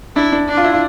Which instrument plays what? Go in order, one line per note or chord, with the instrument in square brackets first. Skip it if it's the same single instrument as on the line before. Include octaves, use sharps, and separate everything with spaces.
[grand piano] D4 [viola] E4
[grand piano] D4
[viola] D4
[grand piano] F4
E4
F4